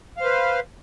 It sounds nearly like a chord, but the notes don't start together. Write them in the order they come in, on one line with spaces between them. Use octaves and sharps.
F5 C5 B4